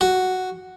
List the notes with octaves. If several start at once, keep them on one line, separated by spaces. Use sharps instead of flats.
F#4